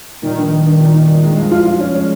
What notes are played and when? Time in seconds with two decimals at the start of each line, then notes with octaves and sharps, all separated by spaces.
0.22 A#2 D#3
0.37 A#1
0.51 A#1
0.66 A#1
0.80 A#2
0.94 D#4
1.08 A#2
1.23 G#3
1.37 F3 G#3
1.51 F4
1.65 F3 F4
1.80 C#4
1.94 G#3 C#4